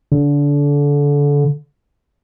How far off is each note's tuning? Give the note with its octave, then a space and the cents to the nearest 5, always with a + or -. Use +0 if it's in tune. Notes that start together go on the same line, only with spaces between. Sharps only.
D3 -30